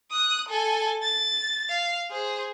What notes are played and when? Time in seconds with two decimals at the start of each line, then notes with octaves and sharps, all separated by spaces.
0.11 D#6 F#6
0.49 A4 G#5
1.02 A6
1.69 F5
2.10 G#4 C5